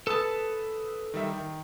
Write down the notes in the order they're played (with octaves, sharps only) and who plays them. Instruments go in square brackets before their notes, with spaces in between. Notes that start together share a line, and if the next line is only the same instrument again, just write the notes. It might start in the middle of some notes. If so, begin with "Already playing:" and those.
[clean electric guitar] A4 A5 [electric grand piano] B4 D#6 E6
[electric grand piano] D#3 G3 E5
D#3